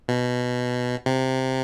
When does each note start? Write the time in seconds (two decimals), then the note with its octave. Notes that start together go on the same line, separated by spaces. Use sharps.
0.08 B2
1.06 C3